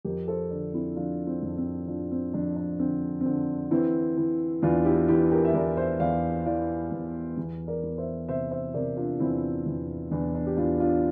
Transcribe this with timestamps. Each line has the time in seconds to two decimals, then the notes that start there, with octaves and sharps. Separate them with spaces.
0.05 F2 G4 A#4
0.28 A4 C5
0.51 D3 D4
0.74 C4 E4
0.96 F3 D4 F4
1.27 C4 E4
1.42 F2
1.58 C4
1.88 F3 D4
2.11 C4
2.34 F2 D4
2.56 D4
2.79 D3 C4
3.21 C4
3.26 D3 D4
3.71 E3 C4 E4
4.17 E3
4.62 E2 D4 F4
4.85 E4 G4
5.08 E3 E4 G4
5.31 G4 A#4
5.45 E5
5.54 E2 A#4 D5
5.77 C5 E5
6.00 E2 D5 F5
6.46 E3 D5 F5
6.92 E2
7.37 E2
7.67 A#4 D5
7.83 E2
7.98 C5 E5
8.28 C3 C5 E5
8.51 C5 E5
8.74 C3 A#4 D5
8.97 D4 F4
9.20 E2 C4 E4
9.66 E2
10.11 E2 D4
10.35 D4
10.47 G4
10.57 E2 D4 F4
10.80 D4 F4